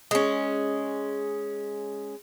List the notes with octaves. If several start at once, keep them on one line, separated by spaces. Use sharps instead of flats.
G#3 C#4